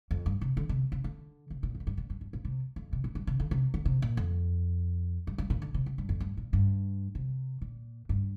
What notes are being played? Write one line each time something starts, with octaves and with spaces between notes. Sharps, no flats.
F2
G2
C3
D3
C3
C3
D3
C3
A#2
F2
A#2
G2
A#2
G2
G2
A#2
C3
F2
C3
A#2
G2
C3
D3
C3
D3
C3
A#2
F2
G2
G2
A#2
D3
C3
C3
G2
F2
G2
A#2
G2
C3
A#2
G2